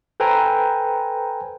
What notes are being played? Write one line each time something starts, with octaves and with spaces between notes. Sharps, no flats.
A4 B4 C5 G5 G#5 A#5